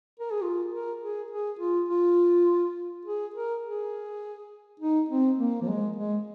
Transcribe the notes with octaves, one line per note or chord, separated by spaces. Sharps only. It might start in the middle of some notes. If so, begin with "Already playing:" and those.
A#4
G#4
F4
A#4
G#4
G#4
F4
F4
G#4
A#4
G#4
D#4
C4
A#3
F3
G#3
G#3